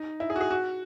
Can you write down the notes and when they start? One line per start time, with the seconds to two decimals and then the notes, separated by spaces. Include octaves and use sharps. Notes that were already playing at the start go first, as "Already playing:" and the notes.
Already playing: D#4
0.20 E4
0.30 G#4
0.36 F#4
0.41 G#4
0.50 F#4